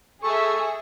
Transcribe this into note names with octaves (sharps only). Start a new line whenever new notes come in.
G#4 A4 E5 C#6